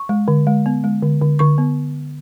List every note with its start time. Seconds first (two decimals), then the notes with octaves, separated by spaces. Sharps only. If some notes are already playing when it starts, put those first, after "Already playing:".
Already playing: C#6
0.09 G#3
0.28 D3
0.47 G#3
0.66 B3
0.84 G#3
1.03 D3
1.22 D3
1.39 D3 C#6
1.58 B3